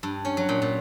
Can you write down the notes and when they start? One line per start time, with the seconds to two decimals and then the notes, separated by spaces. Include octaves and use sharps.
0.03 G2
0.25 C#4
0.37 F#3
0.49 A#2
0.62 A#2